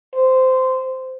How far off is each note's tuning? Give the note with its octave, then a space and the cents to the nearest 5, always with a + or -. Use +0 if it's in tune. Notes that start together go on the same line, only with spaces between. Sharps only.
C5 -15